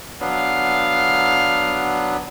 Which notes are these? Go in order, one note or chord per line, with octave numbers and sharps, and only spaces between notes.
F#3 B3 D4 F5